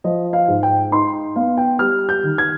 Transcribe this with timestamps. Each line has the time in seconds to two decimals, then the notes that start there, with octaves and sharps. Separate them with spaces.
0.04 F3 D#5
0.33 F5
0.48 G#2
0.63 G5
0.92 D#4 C6
1.36 B3 F5
1.57 G5
1.79 G3 F6
2.09 G6
2.23 D#3
2.38 G#6